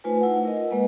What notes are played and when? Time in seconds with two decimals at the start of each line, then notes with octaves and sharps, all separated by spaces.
0.04 A3 D#4 F4 B4 C5 G#5
0.21 E4 F#5
0.45 A#4 D#5
0.70 G#3 A#3 B4